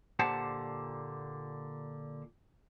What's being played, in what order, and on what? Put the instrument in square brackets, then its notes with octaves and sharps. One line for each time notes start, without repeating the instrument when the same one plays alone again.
[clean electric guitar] A#2 D3 G4 C5 F#5 A5